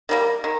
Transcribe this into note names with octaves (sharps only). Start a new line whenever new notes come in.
D#3 G3 A#3
D#3